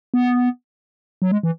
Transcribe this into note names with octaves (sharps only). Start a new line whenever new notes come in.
B3
F#3
G#3
E3